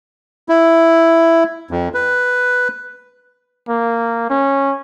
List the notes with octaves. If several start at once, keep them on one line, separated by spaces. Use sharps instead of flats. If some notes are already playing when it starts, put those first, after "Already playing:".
E4
F2
B4
A#3
C#4